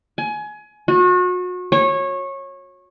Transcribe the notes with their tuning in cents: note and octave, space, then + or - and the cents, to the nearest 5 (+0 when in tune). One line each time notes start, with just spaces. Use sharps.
G#5 +25
F#4 -35
C#5 -20